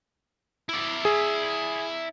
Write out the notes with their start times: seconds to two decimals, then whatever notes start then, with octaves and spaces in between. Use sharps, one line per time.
0.69 E4 D5
1.05 G#4